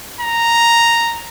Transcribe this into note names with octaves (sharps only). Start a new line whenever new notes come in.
A#5